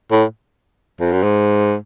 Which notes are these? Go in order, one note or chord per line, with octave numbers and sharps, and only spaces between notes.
A2
F2
F#2
G#2